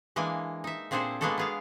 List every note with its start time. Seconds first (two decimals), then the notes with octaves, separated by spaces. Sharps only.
0.16 E3 G#3 A#3 D4 G#5
0.64 D#4 E5
0.91 A#2 C4 D4 G#4 A4 C5
1.21 G#3 A#3 B3 D4 F#4 A4
1.38 B3 G#4 F5